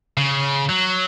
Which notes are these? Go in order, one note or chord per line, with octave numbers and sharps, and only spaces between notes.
C#3
F#3